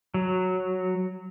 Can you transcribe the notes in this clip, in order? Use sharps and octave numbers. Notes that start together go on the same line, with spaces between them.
F#3